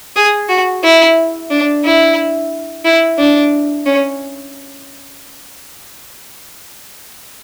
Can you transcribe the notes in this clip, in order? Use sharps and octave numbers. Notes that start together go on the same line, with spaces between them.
G#4
F#4
E4
D4
E4
E4
D4
C#4